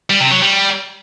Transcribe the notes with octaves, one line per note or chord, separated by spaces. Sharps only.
G3
C3
F#3
G3